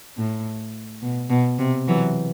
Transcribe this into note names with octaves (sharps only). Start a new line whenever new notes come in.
A2
B2
B2
C3
E3 F#3